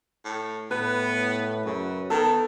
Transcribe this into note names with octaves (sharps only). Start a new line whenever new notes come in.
A2
A2 B3 B4
F#2 C#3
D#3 B3 A4